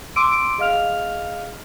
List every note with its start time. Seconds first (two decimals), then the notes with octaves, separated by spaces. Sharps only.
0.16 C6 D6 E6 D7 D#7
0.58 G#4 D#5 F5 F6 F7